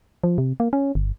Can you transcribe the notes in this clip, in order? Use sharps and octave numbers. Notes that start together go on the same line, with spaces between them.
F3
C3
A#3
C#4
G1